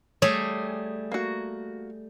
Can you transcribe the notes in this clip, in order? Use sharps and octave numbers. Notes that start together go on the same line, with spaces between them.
G3 A3 G#4 C#5
A#3 F#4